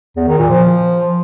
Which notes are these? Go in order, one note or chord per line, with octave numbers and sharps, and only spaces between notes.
E2
D#3
A#2
F3